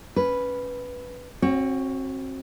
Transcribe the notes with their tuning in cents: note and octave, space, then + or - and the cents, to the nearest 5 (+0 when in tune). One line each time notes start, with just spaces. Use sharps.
C#4 +0 B4 +0
C4 +30 F#4 +0 C#5 +0